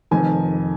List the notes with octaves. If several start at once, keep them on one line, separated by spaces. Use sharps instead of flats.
F1 F2 D#3 G#5